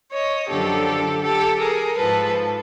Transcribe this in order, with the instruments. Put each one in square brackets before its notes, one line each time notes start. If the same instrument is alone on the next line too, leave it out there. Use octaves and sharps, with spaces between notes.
[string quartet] C#5 D#5
F#2 D3 F3 G4 A4
G4 A4
G#4 A#4
G#2 F3 A4 B4